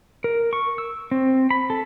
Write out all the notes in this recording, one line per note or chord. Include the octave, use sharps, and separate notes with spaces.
A#4
C#6
E6
C4
B5
A4